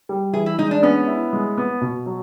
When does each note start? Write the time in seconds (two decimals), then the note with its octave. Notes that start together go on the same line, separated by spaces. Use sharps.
0.09 G3
0.33 E3 G#4
0.46 E4
0.59 G#3 D#4
0.71 D4
0.83 B3 C#4
1.07 E4
1.33 G#3
1.58 B3
1.81 B2
2.06 F#3